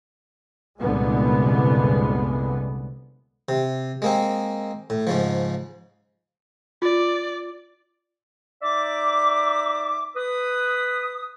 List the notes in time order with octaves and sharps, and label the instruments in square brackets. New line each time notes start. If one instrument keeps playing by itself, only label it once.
[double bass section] C2 F#2 A#2 D3 G#3 B3
[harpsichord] C3
G#3 A#3 C4
A2
G#2 C#3 F3
[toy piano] F4 [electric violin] D5
[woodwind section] D#4 D5 E5 D6
B4 D#6